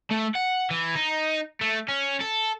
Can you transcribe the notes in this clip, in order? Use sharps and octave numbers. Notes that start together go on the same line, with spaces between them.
A3
F#5
E3
D#4
A3
C#4
A4